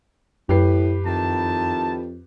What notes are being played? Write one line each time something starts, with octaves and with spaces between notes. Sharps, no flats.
F#2 A2 G4 B4 C7
F2 D#3 E4 A5